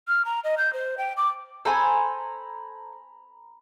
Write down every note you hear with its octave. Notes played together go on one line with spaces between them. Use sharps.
F6
A#5
D#5
G6
C5
G5
D6
A4 C5 G#5 A#5 B5